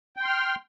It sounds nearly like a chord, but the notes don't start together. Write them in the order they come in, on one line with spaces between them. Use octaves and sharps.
G5 C6 F6